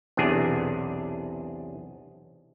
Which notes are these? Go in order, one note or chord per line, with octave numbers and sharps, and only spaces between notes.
B1 E2 C3 D4 G#4